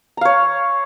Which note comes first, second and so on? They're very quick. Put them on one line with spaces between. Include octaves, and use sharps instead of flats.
A#5 F5 C#5